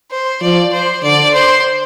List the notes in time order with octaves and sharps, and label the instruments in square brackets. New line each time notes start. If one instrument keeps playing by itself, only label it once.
[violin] C5
[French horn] F3 [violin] D5
[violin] C5
[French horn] D3 [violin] D5
[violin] C5